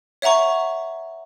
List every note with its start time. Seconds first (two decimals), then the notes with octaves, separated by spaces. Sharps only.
0.22 C#5 E5 F#5 A#5 C#6